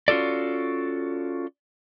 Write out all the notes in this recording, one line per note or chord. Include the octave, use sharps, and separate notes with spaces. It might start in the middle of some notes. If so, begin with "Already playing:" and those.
C#4 F4 F#4 A4 D5